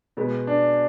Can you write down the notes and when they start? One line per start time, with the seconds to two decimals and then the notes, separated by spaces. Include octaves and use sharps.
0.17 B2 G#3 B3
0.47 D4